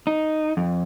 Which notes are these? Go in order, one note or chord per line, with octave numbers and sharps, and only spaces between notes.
D#4
F2